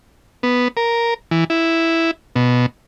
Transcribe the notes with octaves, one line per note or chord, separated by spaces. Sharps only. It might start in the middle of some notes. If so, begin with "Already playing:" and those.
B3
A#4
E3
E4
B2